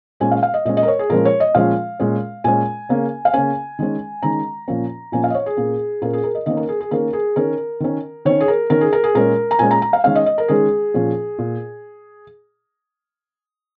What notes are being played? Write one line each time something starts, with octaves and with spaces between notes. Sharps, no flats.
A#2 G#3 C#4 G#5
F5
F5
D#5
A#2 G#3 C#4 D#5
D#5
A#4
C#5
G#4
A#2 F3 G#3 C#4 A#4
C#5
D#5
A#2 F3 G#3 C#4 F5
A#2 G#3 C#4
A#2 G#3 C#4 G#5
C#3 A#3 C#4
F5
C#3 A#3 C#4 G#5
D#3 G#3 C#4
D#3 G#3 C#4 A#5
A#2 F3 A#3 C#4
A#2 F3 A#3 C#4 G#5
F5
D#5
C#5
G#4
A#2 A#3 C#4
A#2 A#3 C#4 A#4
G#4
A#4
D#5
D#3 A#3 C#4 D#5
A#4
G#4
G#4
D#3 A#3 C#4 A#4
G#4
D#3 C#4 A#4
D#3 C#4
D#3 C#4 C#5
G#4
A#4
D#3 C#4 A#4
G#4
A#4
G#4
A#2 G#3 C#4 A#4
A#5
A#2 G#3 C#4 G#5
A#5
A#5
F5
D#3 G#3 C#4 F5
D#5
D#5
A#4
D#3 G#3 C#4 G#4
A#2 F3 C#4
A#2